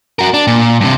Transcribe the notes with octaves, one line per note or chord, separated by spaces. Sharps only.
F#4 A#4
D4
A#2
G2 C3